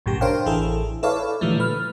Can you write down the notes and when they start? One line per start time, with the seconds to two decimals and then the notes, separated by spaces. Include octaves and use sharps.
0.06 A#1 F#2 A2 C#3 G4 A#6
0.21 D4 A#4 C5 C#5 F5 G5
0.46 A1 E3 E4 G#4 A4
1.03 E4 A4 B4 C#5 D5 F5
1.41 A#2 D3 E3 F3 G3 A3
1.60 B4 F6